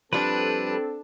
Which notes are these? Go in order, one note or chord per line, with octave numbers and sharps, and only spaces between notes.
F3 G3 C4 D4 A4 B4